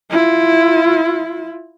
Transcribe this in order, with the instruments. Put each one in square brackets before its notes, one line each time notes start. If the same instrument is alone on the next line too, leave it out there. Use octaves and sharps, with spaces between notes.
[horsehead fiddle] E4 F4